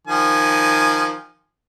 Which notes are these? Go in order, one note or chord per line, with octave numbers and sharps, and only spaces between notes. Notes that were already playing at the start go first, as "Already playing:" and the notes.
D#3 F3 G#5